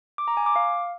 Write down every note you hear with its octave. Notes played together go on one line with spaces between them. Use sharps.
D6
A#5
G#5
D6
F5